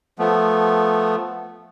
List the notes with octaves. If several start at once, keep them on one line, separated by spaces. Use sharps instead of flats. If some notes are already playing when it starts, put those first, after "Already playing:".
F3 A3 B3